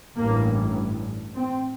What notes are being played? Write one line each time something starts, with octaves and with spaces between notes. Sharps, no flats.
A1 G2 A#3
C4